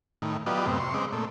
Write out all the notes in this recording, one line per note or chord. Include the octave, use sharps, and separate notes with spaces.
A2 D#3
F#3 B3 F4 G4 D5 D#5
F#2 A2 C3 B3 C4
C3 C6 C#6
C#3 G#3 C4 D#5 D6
A#2 A3